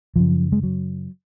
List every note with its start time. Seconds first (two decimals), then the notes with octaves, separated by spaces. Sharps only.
0.16 F#2 C#3 F3
0.52 G#3
0.63 F#3